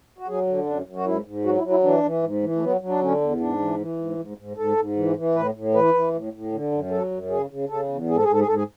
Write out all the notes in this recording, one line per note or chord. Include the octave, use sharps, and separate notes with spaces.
F#4
F#3 G#4
D3
F#2 D4
F#2
F#4
G#2 E4
G#2
F#3 F#4
E4
F#3
E4
E3 D4
E3
G#2
E3
A3
F#3 B3
F#3
D4
D3 C#4
E2
G#2 D4
E3
E3
G#2
G#2
G#2
G#2 A4
G#2
E3
E3
A2 B4
A2
E3 B4
E3
A2
A2
D3
F#2
F#3 A4
F#2
C#3 G#4
C#3
C#3 A4
E2
G#2 G#4
A4
G#4
G#2 A4
G#4
G#2 A4
G#4